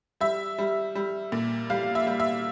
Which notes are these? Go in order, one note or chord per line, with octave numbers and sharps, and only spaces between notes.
G3 E5
G3
G3
A#2
G3 F5
E5
G3
E5